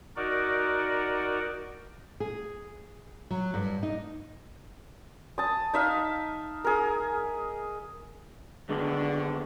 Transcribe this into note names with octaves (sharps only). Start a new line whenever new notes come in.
D#4 F#4 A#4 D5
G#4
F#3
G2
D#4
A5 D#6
D#4 E5 F5
G#4 A#4
D#2 D3 G#3 B3